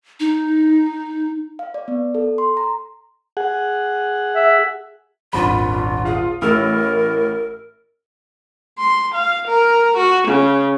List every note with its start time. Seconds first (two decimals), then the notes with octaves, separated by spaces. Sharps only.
0.20 D#4
1.59 F5
1.74 D5
1.88 B3
2.15 A4
2.38 C6
2.57 A#5
3.37 G#4 F#5
4.36 E5
5.33 D#1 G#1 D4 F4 B5
6.05 F4 G#4
6.42 A1 A2 A#4 E6 F6
8.78 C6
9.15 F5
9.47 A#4
9.96 F#4
10.28 C#3